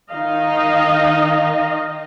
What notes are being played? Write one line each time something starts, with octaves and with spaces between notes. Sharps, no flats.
D#3 D#4 D#5 F5